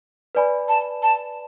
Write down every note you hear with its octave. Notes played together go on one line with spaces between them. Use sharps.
B4 D5 G#5 B5
A5
A5